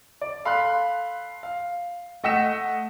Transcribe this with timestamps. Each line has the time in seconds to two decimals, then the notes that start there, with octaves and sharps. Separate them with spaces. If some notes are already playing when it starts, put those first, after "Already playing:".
0.21 D5
0.45 A4 F5 B5 C6 F#6
1.43 F5
2.24 A3 D#5 F#5 E6 B6 E7